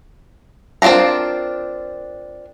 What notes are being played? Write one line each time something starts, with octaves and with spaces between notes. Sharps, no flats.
C4 D4 F4 A#4 A#5